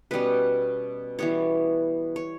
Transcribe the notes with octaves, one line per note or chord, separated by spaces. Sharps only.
B2 G3 C#4 B4
E3 G3 B3 C#5
C#5